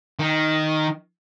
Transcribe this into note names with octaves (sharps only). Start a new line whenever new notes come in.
D#3